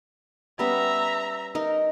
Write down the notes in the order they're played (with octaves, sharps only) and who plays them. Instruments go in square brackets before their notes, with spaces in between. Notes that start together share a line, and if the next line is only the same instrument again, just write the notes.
[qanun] G3 B3 C#4 [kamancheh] E5 A#5
[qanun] D#4 A#4